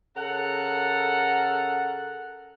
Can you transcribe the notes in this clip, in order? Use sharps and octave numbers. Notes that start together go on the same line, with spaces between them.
C#3 A4 A#4 F#5